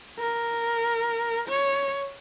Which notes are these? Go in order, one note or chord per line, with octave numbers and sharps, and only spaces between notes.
A#4
C#5